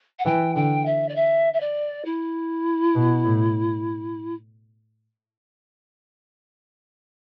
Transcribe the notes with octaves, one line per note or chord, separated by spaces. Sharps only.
F#5
E3 G5
D3 G5
E5
D5
E5
E5
D5
E4
B2
A2